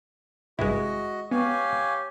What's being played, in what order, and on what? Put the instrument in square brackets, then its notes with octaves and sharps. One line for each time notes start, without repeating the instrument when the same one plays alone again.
[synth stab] G#1 G2 C3 [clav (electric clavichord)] G#3 E4 [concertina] F#4 D#5
[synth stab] B3 [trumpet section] G4 C#5 [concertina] F5 G#5